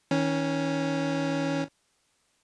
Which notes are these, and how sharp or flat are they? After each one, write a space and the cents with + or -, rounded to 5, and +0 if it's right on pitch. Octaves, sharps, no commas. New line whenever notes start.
D#3 +40 C#4 +0